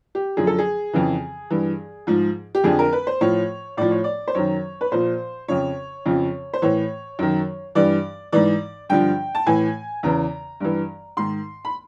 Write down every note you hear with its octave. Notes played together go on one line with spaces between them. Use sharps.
G4
F#2 D3 F3 G#4
A4
G#4
F2 C#3 E3
G2 E3
G#2 F3
G4
F2 D3 F3 G#4
A#4
B4
C5
A2 F3 C#5
A2 F3 D5
C#5
D5
C5
F#2 D#3 C#5
B4
A#2 F3 C5
F2 C#3 F3 C#5
F2 C#3 F3
C5
A2 E3 C#5
F#2 D#3
G2 E3 D5
G#2 E3 D5
G2 D3 F3 G5
A5
A2 E3 G#5
E2 C#3 E3 A#5
G2 E3
G#2 D#3 C6
B5